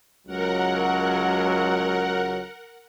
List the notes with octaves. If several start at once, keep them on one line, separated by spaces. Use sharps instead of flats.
C#2 F#3 A#4 F#5